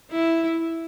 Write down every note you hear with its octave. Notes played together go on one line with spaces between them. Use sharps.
E4